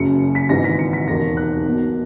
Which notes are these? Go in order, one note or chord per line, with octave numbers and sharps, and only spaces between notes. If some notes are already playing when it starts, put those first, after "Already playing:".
Already playing: F#1 F#2 C#3 C#7
B6
G#1 G#2 E3 A#6
B6
C#7
B6
E1 D#2 D#3 A#6
F#6
B1 B2 A#3